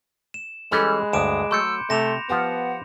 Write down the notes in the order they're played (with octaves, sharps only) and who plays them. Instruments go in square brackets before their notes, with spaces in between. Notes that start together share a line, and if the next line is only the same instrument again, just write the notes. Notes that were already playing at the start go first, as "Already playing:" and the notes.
[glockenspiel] E7
[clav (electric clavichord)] E3 G3 C#4 [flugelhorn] G#3 [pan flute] A4 [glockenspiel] B5 F#6
[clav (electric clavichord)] D2 G2 [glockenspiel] D6 D7 E7 [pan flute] D#6
[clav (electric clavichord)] F#3 A3 [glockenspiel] C6 G6 C#7 [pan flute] E6
[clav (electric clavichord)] C3 [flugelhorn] A3 [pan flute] C6 [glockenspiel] A#6 E7 F7
[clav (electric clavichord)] F3 F4 G4 [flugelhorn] B3 [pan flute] F#5